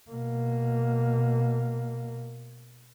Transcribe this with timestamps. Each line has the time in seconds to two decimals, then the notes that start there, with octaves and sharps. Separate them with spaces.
0.11 B2 A#3